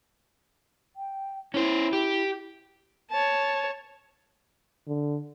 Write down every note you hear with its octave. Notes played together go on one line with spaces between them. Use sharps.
G5
C#4 E4 C5
G4
C#5 A5
D3